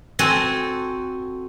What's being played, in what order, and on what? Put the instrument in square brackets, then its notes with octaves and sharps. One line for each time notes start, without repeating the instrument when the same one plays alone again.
[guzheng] C4 F#4 A4 G#5